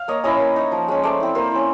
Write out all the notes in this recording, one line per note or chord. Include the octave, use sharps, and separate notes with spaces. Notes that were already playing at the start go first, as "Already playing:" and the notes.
Already playing: F5
A#3 C#5 D#5
C#4 E4 C#5 D#5
A#3
D#4
F3
G#3 C#4
A3 C5 D5
C4 E4
A#3 A#4 C5
C#4 E4